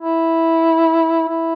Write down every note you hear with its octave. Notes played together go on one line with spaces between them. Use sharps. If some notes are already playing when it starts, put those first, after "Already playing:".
E4
E4